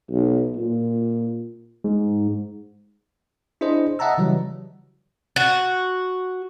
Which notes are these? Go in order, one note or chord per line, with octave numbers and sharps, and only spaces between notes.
B1
A#2
G#2
D4 E4 G#4 C5 D#5
D#5 E5 F#5 A5 A#5 E6
C#3 E3 F#3 G3
F#4